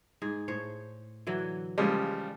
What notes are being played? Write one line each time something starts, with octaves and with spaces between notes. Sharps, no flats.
G#2 G#4
A2 C5 C#5
D3 E3 F#3
C#3 F3 G3 G#3